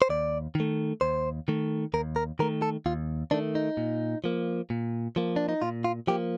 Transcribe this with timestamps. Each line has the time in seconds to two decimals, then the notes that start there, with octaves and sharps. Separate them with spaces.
0.02 C5
0.09 D#2 D5
0.55 D#3 A3
1.01 D#2 C5
1.48 D#3 A3
1.94 D#2 A#4
2.16 A#4
2.39 D#3 A3 A#4
2.62 A4
2.86 D#2 F4
3.31 D#3 A3 D4
3.55 D#4
3.77 A#2
4.24 F3 A#3
4.70 A#2
5.16 F3 A#3
5.36 D4
5.49 D#4
5.62 A#2 F4
5.84 F4
6.07 F3 A#3 G4